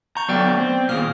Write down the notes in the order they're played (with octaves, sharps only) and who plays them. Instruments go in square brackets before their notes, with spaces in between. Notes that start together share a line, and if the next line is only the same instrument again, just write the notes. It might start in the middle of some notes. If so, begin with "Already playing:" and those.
[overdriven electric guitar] A#5 [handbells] C#6 G6
[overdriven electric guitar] F#3 A3 [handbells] B3 D5 G5
[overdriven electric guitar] C4
[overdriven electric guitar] D#2 A#2 [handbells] G#4 D#6 F6